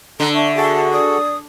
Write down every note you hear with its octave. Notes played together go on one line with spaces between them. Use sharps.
D3 A4 A#5
D4 E5 C#6
F#4 G#4 A4 A5
D5 D#6